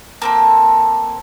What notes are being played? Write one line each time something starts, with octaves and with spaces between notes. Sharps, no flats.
A#3 C4 A4